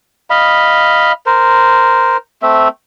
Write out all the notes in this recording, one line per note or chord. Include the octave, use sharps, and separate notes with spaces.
D#5 F5 B5
A#4 C5
A3 C4 E5